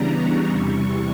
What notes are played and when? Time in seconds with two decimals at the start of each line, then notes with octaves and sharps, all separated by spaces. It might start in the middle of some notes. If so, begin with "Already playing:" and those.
Already playing: C#3 E3 G3 B3 D4 A#5
0.10 C#6
0.49 E2 C3 E3 G3 C#6